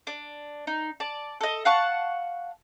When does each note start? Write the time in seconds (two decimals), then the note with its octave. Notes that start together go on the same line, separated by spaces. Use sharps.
0.07 D4
0.67 D#4
1.00 D5 A5
1.41 A4 D#5
1.65 F5 F#5 A5 C#6